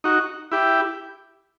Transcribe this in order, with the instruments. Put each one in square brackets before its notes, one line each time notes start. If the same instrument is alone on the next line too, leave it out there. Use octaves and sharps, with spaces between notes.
[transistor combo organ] D#4 F#4
E4 G4